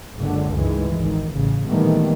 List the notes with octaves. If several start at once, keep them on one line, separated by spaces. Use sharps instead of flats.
F#1 C#2 F#2 D3
C#2 G2 D#3 E3 G#3
G#1 D#3
A1 C#3
A#2 D#3 E3 G3 A3 B3